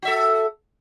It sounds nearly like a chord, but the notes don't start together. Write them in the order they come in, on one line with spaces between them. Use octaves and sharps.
F#4 E5 A4